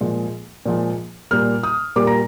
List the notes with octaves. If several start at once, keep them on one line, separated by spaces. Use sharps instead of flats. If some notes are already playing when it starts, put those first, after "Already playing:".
A#2 F3 G#3
A#2 F3 G#3
A#2 G3 A#3 F6
D#6
A#2 G3 A#3 D6
A#5